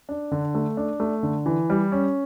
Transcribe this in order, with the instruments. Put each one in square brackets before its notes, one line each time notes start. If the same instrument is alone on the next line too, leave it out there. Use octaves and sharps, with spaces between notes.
[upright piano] D4
D3
A3
D4
A3
D3
E3
G3
C#4